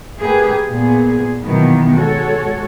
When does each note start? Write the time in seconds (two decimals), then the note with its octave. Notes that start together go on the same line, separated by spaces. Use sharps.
0.19 A#3 G4 G#4 B4
0.66 A#2 B3 G#4
1.43 B2 D#3 E3 F#3 A#3 B3
1.93 G#3 F#4 A4 C#5